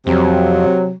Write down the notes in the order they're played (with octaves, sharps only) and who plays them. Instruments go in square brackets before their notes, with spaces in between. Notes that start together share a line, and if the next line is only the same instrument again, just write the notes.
[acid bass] F2 [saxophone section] C3 F#3